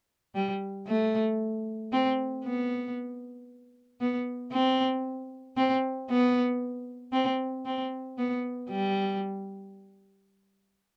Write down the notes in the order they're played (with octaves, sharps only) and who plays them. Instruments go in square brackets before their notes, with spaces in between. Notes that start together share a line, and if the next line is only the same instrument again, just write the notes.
[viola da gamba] G3
A3
C4
B3
B3
C4
C4
B3
C4
C4
B3
G3